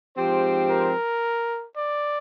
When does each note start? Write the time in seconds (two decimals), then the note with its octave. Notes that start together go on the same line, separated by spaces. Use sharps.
0.18 G#2 F3 C4 G4 C5
0.70 A#4
1.76 D5